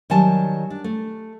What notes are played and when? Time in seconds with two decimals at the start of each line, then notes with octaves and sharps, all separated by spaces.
0.10 D#3 F#3 G3 G#5 A5
0.70 D4
0.84 A3